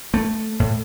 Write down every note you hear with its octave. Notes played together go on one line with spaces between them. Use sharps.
A3
A2